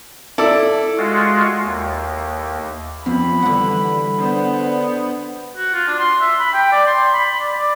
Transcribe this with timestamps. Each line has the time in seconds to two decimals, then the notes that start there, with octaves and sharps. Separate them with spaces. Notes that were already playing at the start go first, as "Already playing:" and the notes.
0.38 E4 A4 D5
0.98 G#3 F4 F#4
1.65 D#2
3.06 F2 F3 B3 B5
3.43 D3 E3 G3 F#5
4.19 B3 D4 C5
5.56 F#4
5.73 F4
5.87 D4
5.99 C6
6.21 E5
6.39 B5
6.53 G5
6.72 D5
6.87 C6
7.13 B5
7.40 D5
7.55 D5